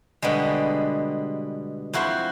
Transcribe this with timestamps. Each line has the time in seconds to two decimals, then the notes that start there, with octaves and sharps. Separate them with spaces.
0.22 B2 D3 G3 G#3
1.93 F2 E4 F#4 C5 C6